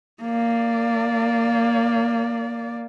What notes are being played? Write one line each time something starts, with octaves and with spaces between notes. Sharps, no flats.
A#3 D5